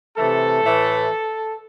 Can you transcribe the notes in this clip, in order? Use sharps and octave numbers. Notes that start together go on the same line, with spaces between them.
C3 E3 A3 A4
A2 E3 A3